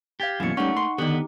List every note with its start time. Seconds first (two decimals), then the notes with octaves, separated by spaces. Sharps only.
0.20 G4 F5 G#6 A6
0.40 F#2 B2 E3 A#3 C#7
0.57 G3 A3 C#4 D#4 F#5 C#6
0.77 C6
0.98 D3 D#3 B3 D#4 G4